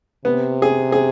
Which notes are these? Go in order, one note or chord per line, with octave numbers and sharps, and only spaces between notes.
C3 B3
G#4
G#4